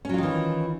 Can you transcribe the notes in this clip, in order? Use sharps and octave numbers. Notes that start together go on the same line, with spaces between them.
D#3 E3 F#3 C#4 F4